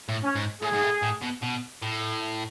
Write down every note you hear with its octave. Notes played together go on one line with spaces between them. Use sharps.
A2
C#4
G#2
A2 G#4
G#2
A2
A2
B2
B2
A2